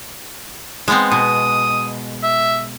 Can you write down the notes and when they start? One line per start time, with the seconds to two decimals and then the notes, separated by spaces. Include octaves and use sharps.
0.88 G#3 B3 C4
1.12 B2 D#6
2.23 E5